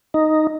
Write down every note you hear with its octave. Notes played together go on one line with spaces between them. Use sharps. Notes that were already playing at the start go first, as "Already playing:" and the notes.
D#4